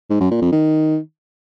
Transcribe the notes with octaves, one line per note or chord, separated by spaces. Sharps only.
G#2
F#2
A#2
F2
D#3